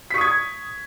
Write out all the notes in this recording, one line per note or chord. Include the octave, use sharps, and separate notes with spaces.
C#6 D#6 G#6 B6